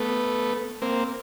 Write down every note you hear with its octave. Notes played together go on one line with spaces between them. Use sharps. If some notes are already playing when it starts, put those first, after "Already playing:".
Already playing: A3 B3
A#3 C4